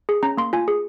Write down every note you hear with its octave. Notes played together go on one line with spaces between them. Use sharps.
G#4
C#4 A#5
A#3 C6
F4 G#5
G#4